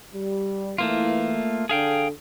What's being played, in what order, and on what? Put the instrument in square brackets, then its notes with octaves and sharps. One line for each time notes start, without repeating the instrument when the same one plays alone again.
[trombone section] G3
[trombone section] E3 [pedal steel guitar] A3 A#3 F4
[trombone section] D3 A4 [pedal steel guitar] G#4 F5 G5